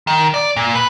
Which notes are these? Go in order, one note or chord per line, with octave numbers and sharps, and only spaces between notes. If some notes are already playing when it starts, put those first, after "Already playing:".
D#3
D5
A#2
B4